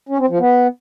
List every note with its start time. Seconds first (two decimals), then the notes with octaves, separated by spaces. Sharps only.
0.09 C#4
0.19 C4
0.29 F3
0.39 B3